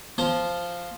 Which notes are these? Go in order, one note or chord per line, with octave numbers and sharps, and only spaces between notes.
F3 C5